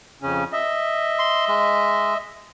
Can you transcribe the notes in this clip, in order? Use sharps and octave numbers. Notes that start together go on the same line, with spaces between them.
F2 C#3 C#4
D#5 E5
C6
G#3